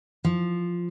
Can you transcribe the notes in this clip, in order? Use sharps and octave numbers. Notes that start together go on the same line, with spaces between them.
F3